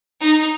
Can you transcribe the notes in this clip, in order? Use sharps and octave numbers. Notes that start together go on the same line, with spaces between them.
D#4